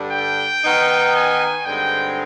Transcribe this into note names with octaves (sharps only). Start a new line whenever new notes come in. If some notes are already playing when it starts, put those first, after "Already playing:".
Already playing: G2 D3 G3 D4
G5
D#3 B3 D#4
G#5
G2 D3 G#3 C4 D#4 G5